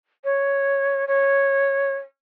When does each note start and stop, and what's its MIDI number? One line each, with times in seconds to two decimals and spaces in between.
0.24 1.05 73
1.08 1.93 73